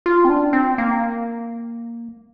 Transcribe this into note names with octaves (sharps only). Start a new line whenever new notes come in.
F4
C4
D4
C4
A#3